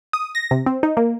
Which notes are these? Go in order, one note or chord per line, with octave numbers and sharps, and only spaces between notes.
D#6
A#6
C3
C4
D#4
A#3